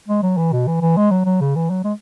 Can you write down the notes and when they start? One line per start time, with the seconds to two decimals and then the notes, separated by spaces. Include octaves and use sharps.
0.08 G#3
0.23 F#3
0.37 E3
0.52 B2
0.67 E3
0.81 E3
0.97 G#3
1.11 F#3
1.25 F#3
1.41 C#3
1.55 E3
1.70 F#3
1.84 G#3